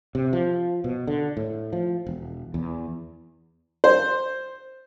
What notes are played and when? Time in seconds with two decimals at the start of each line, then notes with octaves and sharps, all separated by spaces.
0.15 C3
0.33 F3
0.84 B2
1.07 D3
1.37 A2
1.73 F3
2.07 E1
2.54 E2
3.84 C5